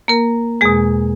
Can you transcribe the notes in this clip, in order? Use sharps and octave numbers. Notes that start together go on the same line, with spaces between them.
A#3 A#4
E2 B2 G#3 G#4